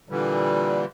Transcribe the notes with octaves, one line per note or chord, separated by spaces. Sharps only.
A#2 D3 E3 G3